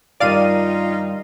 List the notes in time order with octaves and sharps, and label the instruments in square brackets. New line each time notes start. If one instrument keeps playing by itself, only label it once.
[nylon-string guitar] G2 D#3 G3 [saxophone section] D#4 F4 [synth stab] D5 F5 D#7